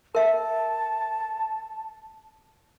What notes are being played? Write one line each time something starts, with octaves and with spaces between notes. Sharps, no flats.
A#4 E5 A5